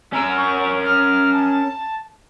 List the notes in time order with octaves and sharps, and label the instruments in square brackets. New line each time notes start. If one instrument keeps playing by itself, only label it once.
[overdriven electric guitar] C#4 A#4 [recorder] E6
[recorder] C#6
F6
A5